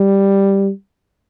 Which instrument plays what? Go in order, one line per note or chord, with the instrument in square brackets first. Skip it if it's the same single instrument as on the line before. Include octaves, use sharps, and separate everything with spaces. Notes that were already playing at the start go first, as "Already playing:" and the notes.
Already playing: [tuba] G3